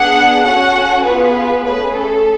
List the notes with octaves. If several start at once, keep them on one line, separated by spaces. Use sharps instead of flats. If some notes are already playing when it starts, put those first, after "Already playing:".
Already playing: B3 D4 G#4 F#5
C#4 F#4 A4 F#5
B3 F4 G#4 B4
A3 C#4 G#4 B4
A4